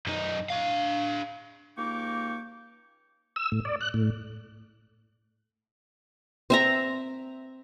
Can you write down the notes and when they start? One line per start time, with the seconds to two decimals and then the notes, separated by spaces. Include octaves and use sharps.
0.07 F#2 D#4
0.50 D4 F5
1.77 C#2 A#3 D#4 G4 C#6 D6
3.36 E6
3.52 A2
3.65 D5
3.81 F#6
3.94 A2
6.50 C4 E5 A#5